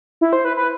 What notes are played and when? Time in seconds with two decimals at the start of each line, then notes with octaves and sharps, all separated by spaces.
0.21 E4
0.33 C5
0.45 B4
0.57 B4